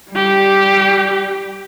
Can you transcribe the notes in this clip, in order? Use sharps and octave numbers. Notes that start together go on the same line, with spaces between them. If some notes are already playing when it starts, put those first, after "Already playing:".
G3 G4